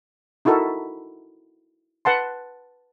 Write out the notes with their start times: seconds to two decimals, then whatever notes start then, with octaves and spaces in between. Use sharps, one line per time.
0.45 D#4 E4 F#4 A4 A#4
2.05 B4 F#5 A5 C6